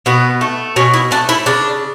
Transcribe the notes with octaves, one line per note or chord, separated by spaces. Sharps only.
B2 B3
A3
B2 C#4
E4
A3 D4
E4
C#3 D4